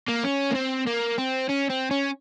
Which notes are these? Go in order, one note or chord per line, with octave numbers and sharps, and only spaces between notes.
A#3
C#4
A#3
C4
A#3
C4
C#4
C4
C#4